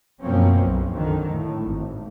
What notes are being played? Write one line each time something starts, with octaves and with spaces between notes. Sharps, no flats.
F#2 B2 F3 A#3 C4 C#4
B1
F2 D3 D#3
A2
G#1